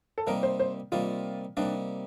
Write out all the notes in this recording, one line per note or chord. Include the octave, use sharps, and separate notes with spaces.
A4
C3 G3 A#3 D#4 A#4
C5
C5
C3 G3 A#3 D#4 F4
C3 G3 A#3 D4 D#4